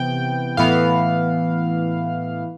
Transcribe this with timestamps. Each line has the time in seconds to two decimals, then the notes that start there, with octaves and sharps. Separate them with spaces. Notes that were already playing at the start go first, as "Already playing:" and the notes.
Already playing: C3 E3 B3 G5
0.57 A2 E3 B3 F5